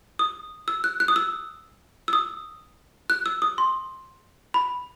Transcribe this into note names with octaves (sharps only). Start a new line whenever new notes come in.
D#6
E6
F#6
F#6
D#6
E6
E6
D#6
F#6
E6
D#6
C6
B5